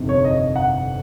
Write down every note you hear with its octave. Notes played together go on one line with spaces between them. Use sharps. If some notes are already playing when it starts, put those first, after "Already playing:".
Already playing: G1 F2 C3 D#3
C#5
D#5
F#5